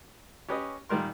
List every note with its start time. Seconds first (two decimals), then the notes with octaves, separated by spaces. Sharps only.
0.48 C#4 G4 B4 C#5 D#5
0.89 A#2 D#3 G3 A#4 C6